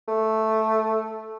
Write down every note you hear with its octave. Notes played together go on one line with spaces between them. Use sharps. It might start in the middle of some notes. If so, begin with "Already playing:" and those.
A3